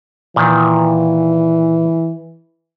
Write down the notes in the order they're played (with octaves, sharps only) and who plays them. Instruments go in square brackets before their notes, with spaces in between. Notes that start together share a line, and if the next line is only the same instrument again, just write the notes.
[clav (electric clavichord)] A#2 D#3 [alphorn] E3